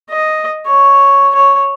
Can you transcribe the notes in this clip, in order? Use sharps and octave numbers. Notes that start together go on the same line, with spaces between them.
D#5
C#5
C#5